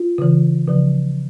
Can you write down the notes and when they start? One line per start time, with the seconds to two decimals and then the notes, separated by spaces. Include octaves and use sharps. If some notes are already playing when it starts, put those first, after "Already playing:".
Already playing: F4
0.18 C#3 E3
0.68 C#3 F3